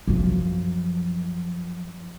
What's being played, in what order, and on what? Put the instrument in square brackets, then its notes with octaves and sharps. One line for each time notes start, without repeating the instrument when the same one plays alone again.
[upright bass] F#2 F3